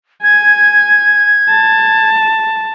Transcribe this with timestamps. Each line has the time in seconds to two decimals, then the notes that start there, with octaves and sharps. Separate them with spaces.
0.23 G#5 G#6
1.50 A5